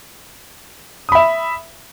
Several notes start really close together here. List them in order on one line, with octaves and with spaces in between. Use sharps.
D#6 B5 E5